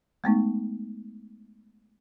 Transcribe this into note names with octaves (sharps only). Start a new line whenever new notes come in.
G#3 A3 B3 D#4